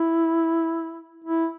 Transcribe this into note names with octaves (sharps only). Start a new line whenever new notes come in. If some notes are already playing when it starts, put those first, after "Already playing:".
Already playing: E4
E4